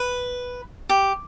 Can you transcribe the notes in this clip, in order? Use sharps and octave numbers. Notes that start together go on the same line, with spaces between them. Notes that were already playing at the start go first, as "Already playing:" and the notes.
Already playing: B4
G4